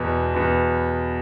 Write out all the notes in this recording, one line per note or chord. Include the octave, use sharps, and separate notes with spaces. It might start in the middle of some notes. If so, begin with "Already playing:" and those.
Already playing: E2 B2 B3
E2 B2 B3